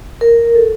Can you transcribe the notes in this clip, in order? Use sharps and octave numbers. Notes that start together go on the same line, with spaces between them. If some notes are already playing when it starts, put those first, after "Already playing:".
A#4
A4